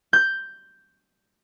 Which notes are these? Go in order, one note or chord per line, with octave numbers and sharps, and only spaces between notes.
G6